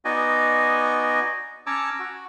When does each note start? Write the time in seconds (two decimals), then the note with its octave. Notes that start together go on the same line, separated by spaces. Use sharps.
0.05 B3 D#4 F#4 D5 D#5 G#5
1.67 C#4 C#5 A5 A#5 D6 E6
1.99 F#4